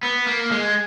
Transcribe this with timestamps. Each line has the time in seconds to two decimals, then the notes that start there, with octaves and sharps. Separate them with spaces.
0.03 B3
0.27 A#3
0.51 G#3